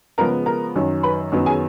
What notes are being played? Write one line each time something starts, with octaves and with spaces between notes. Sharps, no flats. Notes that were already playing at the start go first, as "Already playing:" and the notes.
C#3 F3 G#3 B3 A#4 A#5
A#4 A#5
F#2 D#3 F#3
B4 B5
F#2 D#3 F#3 B3
G#4 G#5